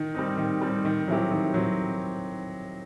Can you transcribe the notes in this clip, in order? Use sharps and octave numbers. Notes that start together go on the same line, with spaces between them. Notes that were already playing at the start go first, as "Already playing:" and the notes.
Already playing: D#3
G3 C4 D#4
D#3
G3 C4 D#4
D#3
F#3 C4 E4 G4
D#3
F#3 C4